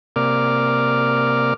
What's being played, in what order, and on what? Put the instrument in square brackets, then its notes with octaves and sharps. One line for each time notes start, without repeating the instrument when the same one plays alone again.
[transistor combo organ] C3 A#3 A#4 D5 D6 F6